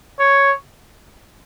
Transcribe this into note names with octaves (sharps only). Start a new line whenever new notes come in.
C#5